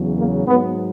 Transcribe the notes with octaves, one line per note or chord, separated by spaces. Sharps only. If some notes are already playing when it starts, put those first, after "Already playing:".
Already playing: E2 C#3 F#3
A#3
G#2 B3
F#3